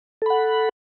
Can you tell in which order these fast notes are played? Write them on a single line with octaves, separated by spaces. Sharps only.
A4 B5 F#5